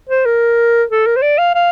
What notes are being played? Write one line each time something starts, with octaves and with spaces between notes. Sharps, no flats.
C5
A#4
A4
A#4
C5
D5
F5
F5